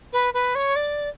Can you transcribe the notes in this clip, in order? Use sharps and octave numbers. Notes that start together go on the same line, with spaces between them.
B4
B4
C#5
D5